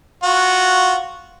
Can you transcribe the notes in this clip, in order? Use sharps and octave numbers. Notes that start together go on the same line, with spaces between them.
F4 F#4